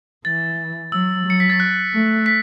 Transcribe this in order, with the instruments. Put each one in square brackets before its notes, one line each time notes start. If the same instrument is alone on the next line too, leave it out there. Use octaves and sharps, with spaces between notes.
[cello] E3 [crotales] A6
[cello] F#3 [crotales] E6
[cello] F#3 [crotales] C#7
[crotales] B6
A6
F#6
[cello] A3
[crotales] B6